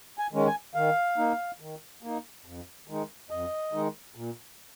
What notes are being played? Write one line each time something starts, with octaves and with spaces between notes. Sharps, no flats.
G#5
D#3 G#3 C#4
G#5
D#3 F5
A#3 D#4
D#3
A#3 D#4
F2
D#3 G#3 D#4
F2 D#5
D#3 G#3 D#4
A#2